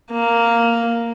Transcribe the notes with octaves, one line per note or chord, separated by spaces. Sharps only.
A#3